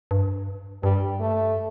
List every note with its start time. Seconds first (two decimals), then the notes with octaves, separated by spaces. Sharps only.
0.11 G2
0.83 G2 G3
1.20 A3